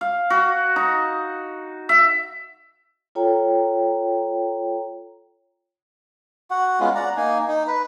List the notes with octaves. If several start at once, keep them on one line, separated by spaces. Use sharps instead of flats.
F5
F#4
D#4
E5
F4 A4 C#5 G5 A#5
F#4 F#5
G#3 B3 C#4 F4
D5 F#5 A#5
A#3 D#4 G#5
D#4
B4